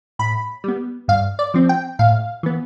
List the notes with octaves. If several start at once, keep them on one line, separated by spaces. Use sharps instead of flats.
A2 B5
G3 B3
G2 F5
D5
F3 C4
G5
A2 F5
E3 B3